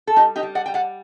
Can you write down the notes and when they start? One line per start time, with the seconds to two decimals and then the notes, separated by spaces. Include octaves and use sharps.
0.07 A4
0.16 G3 D#4 G4
0.36 D#4 G4
0.43 G3
0.55 D5 F#5
0.66 G3 G5
0.74 D5 F#5